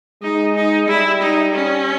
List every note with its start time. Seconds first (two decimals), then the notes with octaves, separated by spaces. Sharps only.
0.22 G#3 D#4
0.55 D#4
0.88 G3 E4
1.22 D#4
1.54 C#4